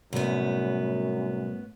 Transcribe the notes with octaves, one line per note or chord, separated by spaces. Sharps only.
C2 F#2 A2 B3